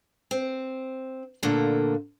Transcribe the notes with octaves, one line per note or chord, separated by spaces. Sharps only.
C4
A#2 D3 A3 A#3